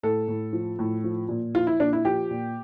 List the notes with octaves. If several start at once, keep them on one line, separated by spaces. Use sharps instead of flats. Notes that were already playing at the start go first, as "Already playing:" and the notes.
A2 A4
A2
F3
A2
F3
A#2
F3 F4
E4
A#2 D4
E4
F3 G4
A#2